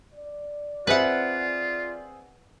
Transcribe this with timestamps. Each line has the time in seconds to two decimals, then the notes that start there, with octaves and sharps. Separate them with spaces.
0.12 D5
0.87 C4 F4 G#4 B4 E5 F#5